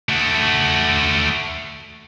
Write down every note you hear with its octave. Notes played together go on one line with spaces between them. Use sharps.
A3 F#4